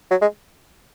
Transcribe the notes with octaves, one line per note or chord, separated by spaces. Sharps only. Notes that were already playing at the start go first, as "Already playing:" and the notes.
F#3
G#3